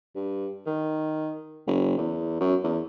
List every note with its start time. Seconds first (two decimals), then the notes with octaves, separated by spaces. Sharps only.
0.15 G2
0.66 D#3
1.67 F#1
1.97 E2
2.40 F#2
2.64 E2